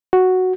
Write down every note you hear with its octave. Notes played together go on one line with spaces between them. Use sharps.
F#4